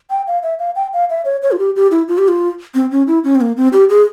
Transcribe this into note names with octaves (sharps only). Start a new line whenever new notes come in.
G5
F5
E5
F5
G5
F5
E5
C#5
C#5
F4
G4
G4
E4
F4
G4
F4
C4
C#4
E4
C#4
C4
A#3
C4
G4
G#4